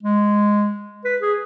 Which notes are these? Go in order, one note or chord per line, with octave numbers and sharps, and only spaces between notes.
G#3
B4
G#4